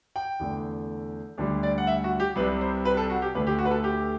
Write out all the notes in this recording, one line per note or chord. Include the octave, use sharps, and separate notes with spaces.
G5
E2 D3 A3
D2 D3 G3
D5
F#5
E5
F#4
G4
C2 C3 G3 B4
C5
B4
A4
F#4
G4
D2 D3 A3 B4
G4
F#4
B4
A4
G4